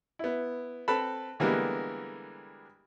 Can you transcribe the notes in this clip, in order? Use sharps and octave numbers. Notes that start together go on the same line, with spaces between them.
B3 E4
C4 A4 B4 A5 B5
D3 E3 G3 G#3 A#3 B3